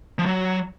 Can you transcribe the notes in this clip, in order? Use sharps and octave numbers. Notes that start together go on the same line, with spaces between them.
F3
F#3